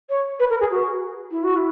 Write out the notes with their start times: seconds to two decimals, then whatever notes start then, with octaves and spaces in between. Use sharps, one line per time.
0.09 C#5
0.39 B4
0.50 A#4
0.60 G#4
0.71 F#4
1.31 E4
1.43 F#4
1.56 E4